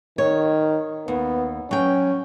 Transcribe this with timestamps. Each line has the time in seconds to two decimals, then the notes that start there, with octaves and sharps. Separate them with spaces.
0.18 D#3 C#5
1.08 D#2 B3
1.71 F#3 C#4 G5